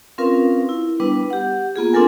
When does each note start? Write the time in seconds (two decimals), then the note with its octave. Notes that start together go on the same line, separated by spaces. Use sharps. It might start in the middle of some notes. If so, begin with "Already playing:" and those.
0.18 C4 C#4 F4 A#4 B4 F5
0.69 E4
1.00 G3 B3 D4 B4
1.30 G4 F#5
1.76 A#3 B3 F4 G#4
1.93 C4 D4 F4 A4 A#4 G#5